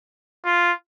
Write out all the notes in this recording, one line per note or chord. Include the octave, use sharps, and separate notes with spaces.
F4